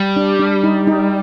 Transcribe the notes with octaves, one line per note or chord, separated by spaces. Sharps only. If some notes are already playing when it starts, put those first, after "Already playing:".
Already playing: G3
D4
D4
D#4
D#4